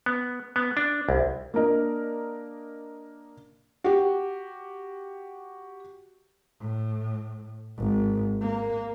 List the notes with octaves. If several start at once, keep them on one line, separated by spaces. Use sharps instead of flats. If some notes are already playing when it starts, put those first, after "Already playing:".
B3
B3
D4
C2
A#3 D4 A#4 D#5
F#4 G4
A2
G#1
A#3